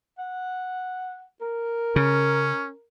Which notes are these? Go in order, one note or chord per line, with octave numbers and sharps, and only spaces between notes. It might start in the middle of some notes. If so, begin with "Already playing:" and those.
F#5
A#4
C#3 C#4